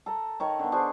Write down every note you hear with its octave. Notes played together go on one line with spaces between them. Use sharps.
A4 A#5
D#3 C#5 A5
D3 B3
D4 G#4 C5 C#6